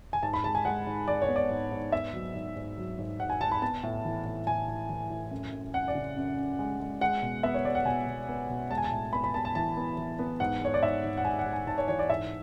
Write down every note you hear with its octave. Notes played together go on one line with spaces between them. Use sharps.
G#5
G#2 A5
B5
G#3 A5
G#5
G#3 F#5
G#2
G#3 D5
C#5
B3
D5
G#2
G#2
B3 E5
F#3
G#2
G#2
F#3
G#2
G#2 F#5
G#5
G#2 A5
B5
B3 A5
A2
E3
A2
A2 G#5
A2
E3
A2
F#2
F#2
F#2 F#5
D5
C#3
F#2
F#2
G#3
G#3
G#3 F#5
B2
B3 E5
C#5
G#3 D5
F#5
B2 G#5
B2
B3
B2
G#3 A5
G#5
A5
A2
B3 B5
B5
B3 A5
A5
E3 A5
B3
E3
B3
G#2 F#5
G#3 C#5
D5
G#2 E5
G#2
F#5
G#2 G#5
F#5
G#2
G#5
G#2 A5
C#5
E3 C#5
D5
G#2 E5